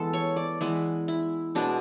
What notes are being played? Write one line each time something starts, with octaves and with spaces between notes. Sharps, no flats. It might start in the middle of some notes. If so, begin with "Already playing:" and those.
Already playing: E3 G#3 B3 A4
C#5
D5
E3 G#3 B3 E4
E4
B2 G#3 B3 D4